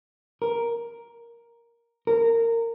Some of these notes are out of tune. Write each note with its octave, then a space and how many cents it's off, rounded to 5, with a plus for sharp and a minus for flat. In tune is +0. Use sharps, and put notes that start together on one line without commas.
A#4 +5
A#4 -20